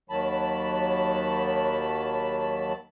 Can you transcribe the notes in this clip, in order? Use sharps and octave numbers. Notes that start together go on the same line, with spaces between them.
D#2 D#3 F#3 A5 B5